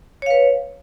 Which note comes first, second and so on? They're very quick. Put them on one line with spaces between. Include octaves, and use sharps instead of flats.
C#5 F5 B4